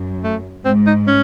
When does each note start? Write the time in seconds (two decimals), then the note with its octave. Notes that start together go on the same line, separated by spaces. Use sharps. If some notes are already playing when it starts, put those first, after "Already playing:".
Already playing: F#2
0.24 A3
0.65 G#2 C4
0.87 D#4
1.07 C#4